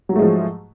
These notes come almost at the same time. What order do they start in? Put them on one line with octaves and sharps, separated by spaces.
F#3 G#2 A3 G#3 F3